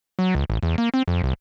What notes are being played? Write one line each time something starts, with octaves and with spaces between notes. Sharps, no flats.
F#3
C#2
A1
E2
A#3
C4
F2
C2